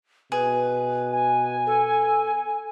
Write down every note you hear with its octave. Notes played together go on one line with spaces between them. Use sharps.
B2 G#4 B4
G#5
A4